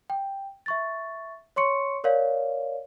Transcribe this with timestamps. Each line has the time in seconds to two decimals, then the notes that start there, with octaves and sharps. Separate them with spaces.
0.10 G5
0.66 E5 C#6 A6
1.56 C#5 C6 C#6 C#7
2.04 A#4 C#5 D5 F5